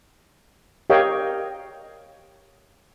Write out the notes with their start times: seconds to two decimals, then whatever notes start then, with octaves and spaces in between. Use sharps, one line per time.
0.90 G4 A#4 C#5 D#5 F5 G5